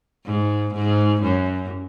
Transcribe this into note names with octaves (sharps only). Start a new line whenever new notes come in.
G#2
G#2
F#2